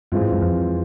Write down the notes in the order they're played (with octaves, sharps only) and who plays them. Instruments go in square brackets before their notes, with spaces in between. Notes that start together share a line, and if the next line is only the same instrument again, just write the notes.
[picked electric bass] G2 [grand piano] E3 G#3 C4 F4
[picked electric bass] G#2
F#2
F2